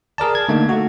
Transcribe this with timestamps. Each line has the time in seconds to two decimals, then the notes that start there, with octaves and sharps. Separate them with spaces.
0.18 G#4 A#4 D5 A5
0.35 G#6
0.49 D3 A3 A#3 D#4
0.69 A3 F#4